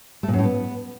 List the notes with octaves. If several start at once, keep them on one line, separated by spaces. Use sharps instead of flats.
A3
A#2
F#2
A2
B3